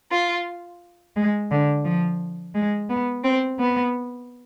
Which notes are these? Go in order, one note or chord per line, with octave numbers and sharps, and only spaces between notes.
F4
G#3
D3
F3
G#3
B3
C4
B3